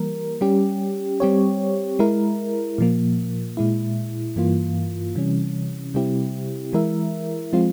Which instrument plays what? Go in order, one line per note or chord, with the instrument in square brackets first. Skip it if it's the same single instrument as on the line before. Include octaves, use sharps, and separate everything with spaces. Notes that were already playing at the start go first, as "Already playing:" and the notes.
Already playing: [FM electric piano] E3 G3 A#3 A#4
G3 C#4 G4
G3 C4 G4 C#5
G#3 E4 A#4
A#2 F3 A#3
A#2 G#3 E4
G2 E3 A#3 F4
C3 E3 G3 C#4
C3 G3 C4 E4 G4
E3 G#3 E4 A#4 E5
F3 G#3 C4 F4